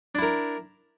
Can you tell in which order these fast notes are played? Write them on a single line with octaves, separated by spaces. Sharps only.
D4 E4 A#4